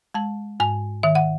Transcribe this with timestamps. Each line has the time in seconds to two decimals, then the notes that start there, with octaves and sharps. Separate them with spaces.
0.14 G#3 A5
0.60 G#2 G#5
1.03 D#3 E5
1.15 F#5